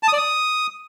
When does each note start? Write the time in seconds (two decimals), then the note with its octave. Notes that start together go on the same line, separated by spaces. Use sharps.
0.03 A5
0.08 D#6
0.13 D5
0.18 D#6